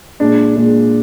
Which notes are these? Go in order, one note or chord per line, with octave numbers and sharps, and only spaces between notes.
A#2 G#3 D4
A#2 G#3 D4